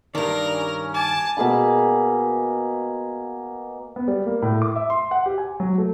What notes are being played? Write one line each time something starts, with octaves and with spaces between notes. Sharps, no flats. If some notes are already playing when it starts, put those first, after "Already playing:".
G2 D#3 A#4 D5
C#4
G#5 A5 D6
B2 A#3 G#4 B5
B3
G3
A#3
A2
D6
E5
C6
F#5
G4
G#5
F#3
A3